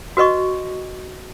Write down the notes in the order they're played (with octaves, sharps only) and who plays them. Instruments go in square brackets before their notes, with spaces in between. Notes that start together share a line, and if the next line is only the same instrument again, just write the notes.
[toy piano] F#4 B4 D#5 C#6